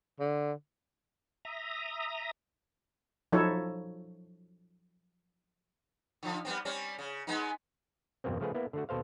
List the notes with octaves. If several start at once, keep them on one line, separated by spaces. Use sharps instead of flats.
D3
E5 A#5 D#6
F3 F#3 D#4 E4 A4 C#5
D3 F3
G3 B3 C4
G3 C4 C#4
C#3
G#3 B3 D#4
G#1 F2 B2 A#3 C4
C#3 F3 A3 F#4 G#4 B4
A#3 B3 E4
D3 A3 F#4
D#2 B2 A4 C5 F5